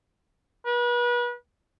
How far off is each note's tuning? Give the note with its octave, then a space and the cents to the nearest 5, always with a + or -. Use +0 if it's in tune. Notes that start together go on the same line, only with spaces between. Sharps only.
B4 -35